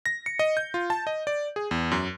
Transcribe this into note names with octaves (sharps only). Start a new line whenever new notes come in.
A#6
C#7
D#5
G6
F4
A5
D#5
D5
G#4
E2
F#2